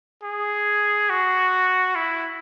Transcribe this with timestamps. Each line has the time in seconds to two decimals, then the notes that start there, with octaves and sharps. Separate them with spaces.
0.23 G#4
1.10 F#4
1.95 E4